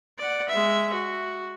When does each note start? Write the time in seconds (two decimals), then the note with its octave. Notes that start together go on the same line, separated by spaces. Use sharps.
0.19 D5 F#5
0.49 G#3 E5
0.94 F#4